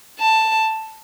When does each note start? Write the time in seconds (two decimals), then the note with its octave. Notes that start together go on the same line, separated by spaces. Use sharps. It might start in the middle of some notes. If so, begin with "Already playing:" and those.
0.19 A5